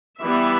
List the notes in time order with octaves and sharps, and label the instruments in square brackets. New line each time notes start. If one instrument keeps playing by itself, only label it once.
[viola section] E3 G3 B3 E5